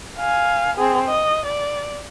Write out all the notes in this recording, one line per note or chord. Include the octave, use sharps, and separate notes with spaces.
F5 G#5
C4 G#4
D#5
D5